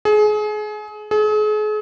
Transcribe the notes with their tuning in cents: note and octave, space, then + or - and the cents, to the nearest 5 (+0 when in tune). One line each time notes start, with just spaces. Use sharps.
G#4 +30
G#4 +40